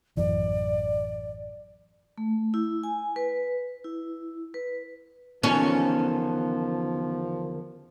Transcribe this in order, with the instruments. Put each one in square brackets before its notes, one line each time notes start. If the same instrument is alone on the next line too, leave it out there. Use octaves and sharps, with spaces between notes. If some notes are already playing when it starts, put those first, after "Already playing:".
[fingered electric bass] A1 F#2 E3 [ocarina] D5
[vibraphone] A3
E4
G#5
B4
E4
B4
[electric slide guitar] E2 D3 D#3 [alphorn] F3 [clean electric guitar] B3 F4 A4 [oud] C#4